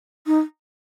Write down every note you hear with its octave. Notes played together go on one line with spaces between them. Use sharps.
D#4